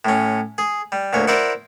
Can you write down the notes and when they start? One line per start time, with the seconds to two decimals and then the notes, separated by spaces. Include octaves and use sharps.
0.05 A2 C#4
0.58 G#4
0.92 G3
1.13 D2 A#2 C#5
1.27 E4 A#4 C5 D5 E5 F#5